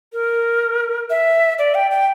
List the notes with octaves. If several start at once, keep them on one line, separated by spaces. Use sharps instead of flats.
A#4
E5
D5
G5
G5